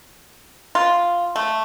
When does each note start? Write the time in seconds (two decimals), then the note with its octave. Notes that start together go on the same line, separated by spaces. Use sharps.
0.75 F4
1.36 A3